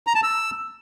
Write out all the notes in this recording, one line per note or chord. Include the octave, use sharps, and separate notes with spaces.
A#5
A5
E6